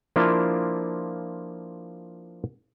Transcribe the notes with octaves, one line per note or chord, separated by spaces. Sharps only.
F3 A#3 D4 E4 F4